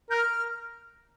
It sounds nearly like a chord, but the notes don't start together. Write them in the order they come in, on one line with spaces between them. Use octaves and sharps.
A#4 G6 F6